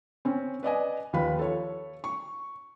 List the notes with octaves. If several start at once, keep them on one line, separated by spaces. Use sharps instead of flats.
C4 C#4
B4 D5 D#5 G#5
D#2 F3 B4 F5 B5
A4 C#5
C#6